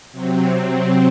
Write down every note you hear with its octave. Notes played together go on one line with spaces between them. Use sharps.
C3 F#3 C4